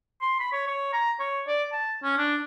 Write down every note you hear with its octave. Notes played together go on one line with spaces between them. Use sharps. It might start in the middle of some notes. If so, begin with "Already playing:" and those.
C6
B5
C#5
C#5
A#5
C#5
D5
A5
C#4
D4